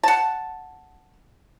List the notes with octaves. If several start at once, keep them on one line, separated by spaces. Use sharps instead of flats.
F#5 A5